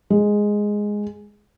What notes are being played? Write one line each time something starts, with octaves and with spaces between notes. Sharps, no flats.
G#3